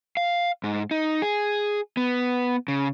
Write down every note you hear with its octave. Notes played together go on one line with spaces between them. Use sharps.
F5
G#2
D#4
G#4
B3
C#3